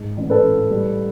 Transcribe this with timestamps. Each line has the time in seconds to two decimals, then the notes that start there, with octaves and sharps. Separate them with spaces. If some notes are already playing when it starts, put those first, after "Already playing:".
Already playing: G#2
0.17 A1
0.30 A4 B4
0.43 A1
0.70 G3